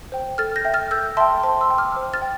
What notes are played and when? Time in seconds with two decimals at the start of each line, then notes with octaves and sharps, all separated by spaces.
0.12 C5 G5
0.38 A4 F6 A6
0.56 G6 A#6
0.65 E5 G5
0.74 F6 A6
0.91 A4 E6 G6
1.17 E5 G5 A5 C6
1.43 C5 A5 C6
1.61 C6 E6
1.70 G5
1.78 D6 F6
1.96 C5
2.14 F6 A6
2.22 G5